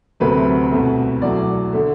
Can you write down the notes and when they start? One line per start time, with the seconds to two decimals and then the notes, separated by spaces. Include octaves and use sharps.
0.20 D2 C3 F#3 A3 B4
0.71 C2 B2 A3
1.22 E2 B2 F#3 A3 D5
1.73 D3 A3